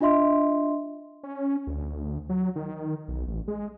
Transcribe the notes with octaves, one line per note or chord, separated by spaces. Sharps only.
D4 F4 D#5 E5 C6
C#4
D2
F#3
D#3
B1
A1
G#3